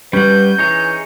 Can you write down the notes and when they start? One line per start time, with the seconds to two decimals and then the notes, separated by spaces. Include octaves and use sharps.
0.13 G3 C#4 B4 F#5 G6
0.58 E3 D#4 G#4 C#5